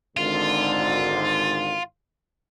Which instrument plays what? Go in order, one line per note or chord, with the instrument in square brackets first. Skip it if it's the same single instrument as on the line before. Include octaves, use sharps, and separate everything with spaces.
[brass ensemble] G#1 G#2 D3 [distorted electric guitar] F4